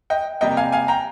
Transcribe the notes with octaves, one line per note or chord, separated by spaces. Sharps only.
D#5 G5
C3 G3 A#3 D#5 G5
F5 G#5
F5 G#5
G5 A#5